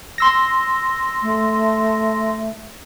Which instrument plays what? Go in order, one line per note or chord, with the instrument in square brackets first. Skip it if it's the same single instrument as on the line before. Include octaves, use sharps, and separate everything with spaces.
[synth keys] C6 E6 A#6
[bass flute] A3